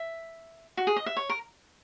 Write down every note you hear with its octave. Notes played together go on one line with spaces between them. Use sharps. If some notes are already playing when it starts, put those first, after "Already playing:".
Already playing: E5
F#4
G#4
D#5
E5
C#5
A#4